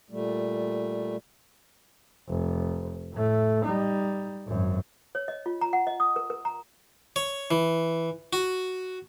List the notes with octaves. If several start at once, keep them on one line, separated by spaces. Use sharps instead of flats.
A#2 G3 A3
F1
A2 A3
G3 D#4
G#1 F#2
C#5
D#5
F4
A#5
F#5
D#5
D#6
A#4
A#4
A#5
C#5
E3
F#4